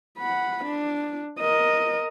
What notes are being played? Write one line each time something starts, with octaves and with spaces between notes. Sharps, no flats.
F#5 B5
D4
A#4 D#5